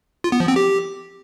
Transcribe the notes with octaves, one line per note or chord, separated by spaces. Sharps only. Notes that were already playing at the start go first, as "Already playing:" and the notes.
F4
B3
F3
C4
G4